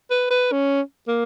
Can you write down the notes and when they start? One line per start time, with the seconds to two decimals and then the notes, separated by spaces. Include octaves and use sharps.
0.10 B4
0.31 B4
0.52 C#4
1.08 A#3